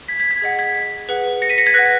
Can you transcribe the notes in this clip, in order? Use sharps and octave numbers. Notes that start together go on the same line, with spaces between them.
G#6 B6
G#6 B6
G#6 B6
G#4 D#5 F#5
G#6 B6
G#4 B4 F#5
A#6 C#7
B6 D#7
A#6 C#7
G#6 B6
B4 F#5 F#6 A#6